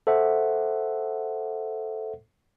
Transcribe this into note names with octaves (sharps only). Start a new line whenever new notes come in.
A4 C5 E5 F#5